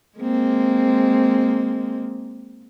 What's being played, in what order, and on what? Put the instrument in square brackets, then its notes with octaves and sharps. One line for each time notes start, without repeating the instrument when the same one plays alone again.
[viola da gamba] G#3 A#3 C4